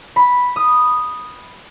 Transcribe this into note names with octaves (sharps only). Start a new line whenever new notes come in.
B5
D#6